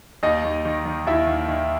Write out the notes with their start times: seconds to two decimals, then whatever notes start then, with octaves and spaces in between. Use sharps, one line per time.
0.23 D#2 D#4 D#5
0.44 D#2
0.65 D#3
0.85 D#3
1.07 D#2 E4 E5
1.27 D#2
1.48 D#3